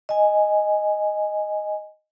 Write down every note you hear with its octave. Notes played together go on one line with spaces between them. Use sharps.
D#5 G#5